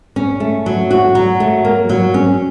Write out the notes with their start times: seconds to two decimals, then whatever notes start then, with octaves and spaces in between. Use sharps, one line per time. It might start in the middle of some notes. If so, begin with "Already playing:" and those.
0.16 C#4
0.40 A3
0.66 F#3
0.91 F#4
1.15 F#3
1.40 A3
1.65 A#3
1.89 F#3
2.14 C#4